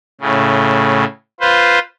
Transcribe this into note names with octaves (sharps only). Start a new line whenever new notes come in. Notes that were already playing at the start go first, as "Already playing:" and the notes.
A2 C#3
F4 B4 C5